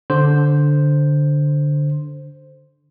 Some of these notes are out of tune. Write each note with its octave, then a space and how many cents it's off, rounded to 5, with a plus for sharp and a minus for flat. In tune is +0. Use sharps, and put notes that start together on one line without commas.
D3 +0 C5 +0